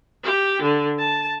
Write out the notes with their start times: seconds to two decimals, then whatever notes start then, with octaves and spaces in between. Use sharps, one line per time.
0.23 G4
0.62 D3
0.98 A5